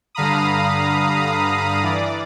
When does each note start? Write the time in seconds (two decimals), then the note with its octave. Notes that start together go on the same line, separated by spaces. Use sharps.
0.15 G2 D3 F5 A#5 B5 D#6
1.83 E3 D5